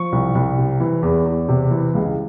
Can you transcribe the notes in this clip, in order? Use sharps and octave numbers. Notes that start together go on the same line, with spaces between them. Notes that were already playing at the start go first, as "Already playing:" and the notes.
Already playing: F3 C#6
C2
C2
C3
E3
E2
E2
C3
E3
C#2